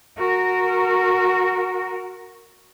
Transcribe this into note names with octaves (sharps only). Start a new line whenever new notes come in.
F#4 A#4